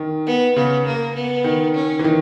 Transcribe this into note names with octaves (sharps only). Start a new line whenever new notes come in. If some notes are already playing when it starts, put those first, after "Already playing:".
Already playing: D#3
B3
C#3 B3
A#3
B3
D#3
C#4
E3
D#3